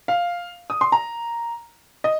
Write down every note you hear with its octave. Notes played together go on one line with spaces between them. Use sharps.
F5
D#6
C6
A#5
D#5